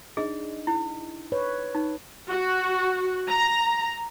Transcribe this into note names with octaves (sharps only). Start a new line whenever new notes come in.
D4 D#4 G#4 D#5
E4
B4 C#5
D#4
F#4
A#5